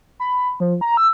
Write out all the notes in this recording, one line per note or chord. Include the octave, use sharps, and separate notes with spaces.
B5
F3
A#5
E6